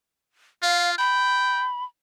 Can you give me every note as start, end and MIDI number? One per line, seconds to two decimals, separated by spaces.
0.63 0.95 65
0.63 0.91 77
0.98 1.66 79
0.98 1.84 83